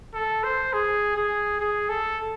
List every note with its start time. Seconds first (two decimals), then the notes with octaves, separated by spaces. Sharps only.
0.14 A4
0.44 C5
0.73 G#4
1.17 G#4
1.60 G#4
1.89 A4